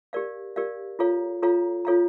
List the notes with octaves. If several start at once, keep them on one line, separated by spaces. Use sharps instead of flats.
G4 A#4 D5 F5
G4 A#4 D5 F5
F4 A4 C#5 F5 A#5
F4 A4 C#5 F5 A#5
F4 A4 C#5 F5 A#5